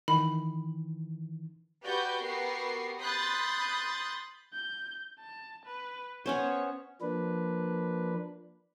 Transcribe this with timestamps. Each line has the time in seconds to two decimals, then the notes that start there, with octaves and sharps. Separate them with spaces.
0.08 D#3 E3 B5
1.85 F#4 G4 B4 D5 G6
2.23 B3 F#4 G4 A#4 C7
3.01 B5 C6 D#6 F#6 G6 A6
4.53 G6
5.20 A5
5.66 B4
6.26 B3 C#4 C5 C#5
7.01 F3 A#3 D4 B4